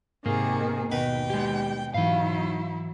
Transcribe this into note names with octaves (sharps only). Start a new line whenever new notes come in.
G#2 C3 D#3 A#3 G#4
D#2 B2 B4 G5
G#3 G4
G#2 E3 F#3 D#4 E4 F5